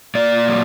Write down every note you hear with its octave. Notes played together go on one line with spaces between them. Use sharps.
A#3 D5
F#3